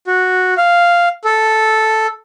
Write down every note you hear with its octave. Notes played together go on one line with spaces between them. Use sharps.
F#4
F5
A4